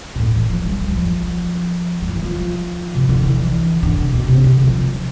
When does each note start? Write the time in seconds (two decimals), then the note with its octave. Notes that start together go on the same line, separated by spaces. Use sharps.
0.15 B2
0.20 A2
0.35 E3
0.50 F3
0.65 G3
0.80 F3
0.88 G3
0.96 F3
2.02 G3
2.09 F3
2.16 E3
2.24 F3
2.95 C3
3.09 D3
3.23 E3
3.83 D3
3.99 C3
4.13 B2
4.28 C3
4.44 D3
4.63 F3
4.84 F3